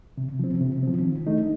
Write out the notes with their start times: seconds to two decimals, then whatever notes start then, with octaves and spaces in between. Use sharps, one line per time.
0.18 C3
0.39 F3 C4
0.61 C3
0.83 F3 C4
1.05 D#3
1.27 A3 D#4